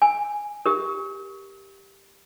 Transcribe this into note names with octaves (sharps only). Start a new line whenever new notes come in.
G#5
G4 A#4